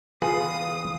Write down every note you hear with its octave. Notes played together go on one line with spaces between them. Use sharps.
E2 F4 G#4 B4 F5 D#6